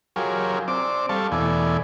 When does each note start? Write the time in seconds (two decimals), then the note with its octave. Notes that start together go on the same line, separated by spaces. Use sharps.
0.16 F#3 F4 G4 G#4 A#4 C#5
0.68 C4 D5 D6
1.09 G3 A4 F5 A5 C#6
1.32 E2 B2 A3 E4 D5 G#5